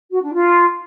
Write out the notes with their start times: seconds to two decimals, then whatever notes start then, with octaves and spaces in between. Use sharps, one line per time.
0.11 F#4
0.22 D4
0.33 F4